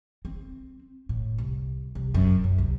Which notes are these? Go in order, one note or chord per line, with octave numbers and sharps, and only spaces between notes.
C4
A2
C2
C2
F#2
F#2
C2